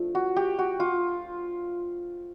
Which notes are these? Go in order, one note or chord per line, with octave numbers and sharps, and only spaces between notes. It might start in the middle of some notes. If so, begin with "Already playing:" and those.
Already playing: F3 A3 D4
F#4
G4
F#4
F4